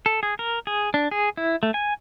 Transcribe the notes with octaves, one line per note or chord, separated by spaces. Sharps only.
A4
G#4
A#4
G#4
D4
G#4
E4
A3
G#5